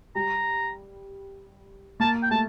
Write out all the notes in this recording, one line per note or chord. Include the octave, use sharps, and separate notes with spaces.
G3 A#5
A#3 A5
G5
A3 A5